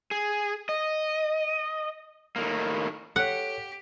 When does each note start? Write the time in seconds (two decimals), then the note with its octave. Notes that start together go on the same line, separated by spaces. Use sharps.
0.11 G#4
0.69 D#5
2.36 A2 D#3 A#3
3.16 G4 A4 C#5 F#5